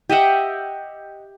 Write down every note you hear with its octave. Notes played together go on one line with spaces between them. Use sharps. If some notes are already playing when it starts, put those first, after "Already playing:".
G4 D#5 E5 F#5